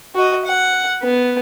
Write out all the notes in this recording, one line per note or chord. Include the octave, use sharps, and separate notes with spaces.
F#4 D#5
F#5
B3